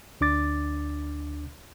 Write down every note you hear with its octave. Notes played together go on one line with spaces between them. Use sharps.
D2 D4 D6 A6